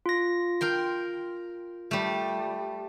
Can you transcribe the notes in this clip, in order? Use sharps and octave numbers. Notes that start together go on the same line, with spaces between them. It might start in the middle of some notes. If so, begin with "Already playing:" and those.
F4 A#6
A#4 G5 C6
G3 A3